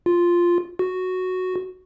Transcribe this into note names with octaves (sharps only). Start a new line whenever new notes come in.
F4
F#4